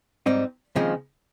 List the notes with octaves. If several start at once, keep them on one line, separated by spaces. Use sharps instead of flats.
G#2 G3 C4 D#4
D#2 C#3 F3 G#3 C4